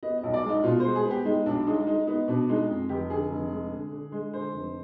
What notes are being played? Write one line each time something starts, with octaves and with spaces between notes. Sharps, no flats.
B3 D#5
D#5
B1
D5
G#3
D#4
B2 F4
C5
G#3
G#4
B3
G4
G#3 D#4
B1 D4
G#3 D#4
G#3 D#4
B3 D#4
B2 D4
G#3 D#4
F2
F1 G4
D3 G#4
F1
G#3
D3
D3
G#3
D3 C5
F1